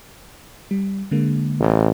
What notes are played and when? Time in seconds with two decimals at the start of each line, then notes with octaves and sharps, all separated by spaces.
0.71 G3
1.11 D3 G#3 A#3
1.60 A1